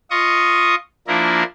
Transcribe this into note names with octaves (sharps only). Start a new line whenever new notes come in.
F4 D#5 C#6 D#6
F3 A#3 D4 E4 A#4